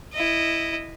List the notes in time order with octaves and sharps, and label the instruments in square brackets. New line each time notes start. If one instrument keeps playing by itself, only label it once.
[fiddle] E4 D#5